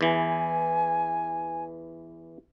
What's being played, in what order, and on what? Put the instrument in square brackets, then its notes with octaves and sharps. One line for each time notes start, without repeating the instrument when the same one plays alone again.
[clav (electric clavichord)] E2 E3 [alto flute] G#5